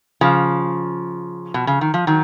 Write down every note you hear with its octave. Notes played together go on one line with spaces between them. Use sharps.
C#3 F3
B2
C#3
D#3
F3
D#3 F#3